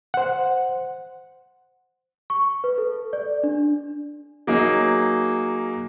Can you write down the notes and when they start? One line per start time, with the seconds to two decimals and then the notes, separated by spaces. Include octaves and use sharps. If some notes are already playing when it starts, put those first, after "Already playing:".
0.14 C5 F#5
2.30 C#6
2.64 B4
2.78 A4
3.13 D5
3.43 D4
4.47 F#3 A#3 D#4 G#4